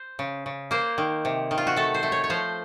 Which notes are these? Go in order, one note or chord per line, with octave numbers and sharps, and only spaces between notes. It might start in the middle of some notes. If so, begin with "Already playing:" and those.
Already playing: C5
C#3
C#3
A#3 C5
D#3
C3
D#3
F4
F#4
A3 A4
C5
A3
C#5
C#5
F3 C5